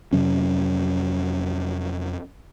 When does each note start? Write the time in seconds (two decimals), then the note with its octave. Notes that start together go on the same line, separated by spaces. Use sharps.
0.13 F2 C3 F#3 C#4